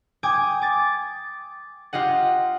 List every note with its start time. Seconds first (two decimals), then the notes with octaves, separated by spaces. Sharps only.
0.23 G5 G#5 D6 D#6 G#6
0.62 D6 A6
1.93 F4 G4 D#5 F#5